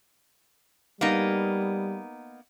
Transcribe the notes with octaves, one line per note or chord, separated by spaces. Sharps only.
G3 A#3 B3 D#4